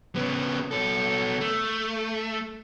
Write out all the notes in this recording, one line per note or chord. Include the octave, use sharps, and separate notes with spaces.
C#3 B3
B2 A4
A3